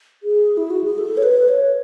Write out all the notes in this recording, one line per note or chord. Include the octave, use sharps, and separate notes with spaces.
G#4
E4
F#4
G#4
A4
C#5
B4
C#5